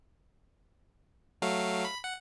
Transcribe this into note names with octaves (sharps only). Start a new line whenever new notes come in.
F#3 A3 F5
B5
F#5